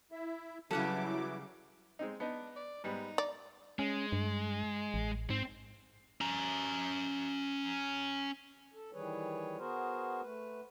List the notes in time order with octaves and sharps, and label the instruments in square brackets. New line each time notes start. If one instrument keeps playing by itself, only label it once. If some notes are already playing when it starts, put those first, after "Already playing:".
[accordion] E4 E5
[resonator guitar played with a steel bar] C#3 G3 [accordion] E3 E4 [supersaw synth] F#3 D6 [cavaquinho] A4 F#5
[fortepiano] G#3 C4 D#4
[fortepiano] B3 D#4 [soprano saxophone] D4
[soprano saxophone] D5
[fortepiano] G#2 G3 B3 [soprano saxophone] D#4
[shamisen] D5 [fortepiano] A#5
[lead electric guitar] G#3 [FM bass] C#4
[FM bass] G2
A1
[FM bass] G#2 [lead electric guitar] C4
[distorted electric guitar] C#4 A#5
[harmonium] A4
D#3 E3 G3 G#4 B4 C#5
B3 F#4 G#4 A#4 C5
A3 B4